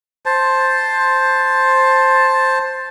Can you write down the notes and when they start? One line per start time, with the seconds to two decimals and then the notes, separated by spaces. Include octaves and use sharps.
0.26 C5 A5